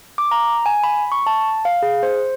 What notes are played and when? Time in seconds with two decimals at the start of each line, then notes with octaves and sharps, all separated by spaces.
0.18 D6
0.31 A#5
0.66 G#5
0.83 B5
1.12 C#6
1.27 A5
1.65 F5
1.82 G#4
2.03 C5